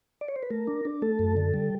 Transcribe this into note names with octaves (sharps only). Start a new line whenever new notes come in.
D5
C#5
C5
B4
A3 A#4
D4
D4
A3 A4
F#2
D3
G3